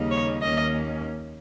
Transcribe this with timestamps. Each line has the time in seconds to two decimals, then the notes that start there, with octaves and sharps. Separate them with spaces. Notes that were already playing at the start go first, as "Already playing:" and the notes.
Already playing: D#2 C#3 G3 A#3 D#4
0.11 C#5
0.41 D#2 D#3 A#3 C#4 D#5